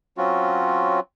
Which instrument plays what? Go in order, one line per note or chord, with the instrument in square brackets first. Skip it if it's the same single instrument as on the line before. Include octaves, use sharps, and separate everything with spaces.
[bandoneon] F#3 C4 C#4 F4 F#4